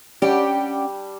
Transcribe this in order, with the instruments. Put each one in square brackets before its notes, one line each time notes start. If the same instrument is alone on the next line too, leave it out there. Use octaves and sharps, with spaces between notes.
[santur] G3 D4 [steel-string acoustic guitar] C#4 D5 F#5 [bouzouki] G4